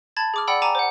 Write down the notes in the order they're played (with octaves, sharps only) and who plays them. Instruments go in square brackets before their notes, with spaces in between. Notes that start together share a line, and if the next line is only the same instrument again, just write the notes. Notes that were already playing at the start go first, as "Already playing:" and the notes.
[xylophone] A5 B5 G#6 A6
G#4 D6 F6
D5 F#5 G5 B5 E6
G#5 A#5 D6 E7
C5 F#5